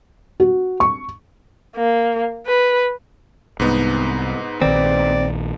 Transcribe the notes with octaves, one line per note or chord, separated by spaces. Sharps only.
F#4
C#6
A#3
B4
C2 G#2 B3 D#4
A#1 D#3 C4 D5